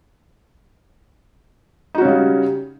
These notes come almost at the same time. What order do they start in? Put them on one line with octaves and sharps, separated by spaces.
D#4 F#4 C#4 C#3 G3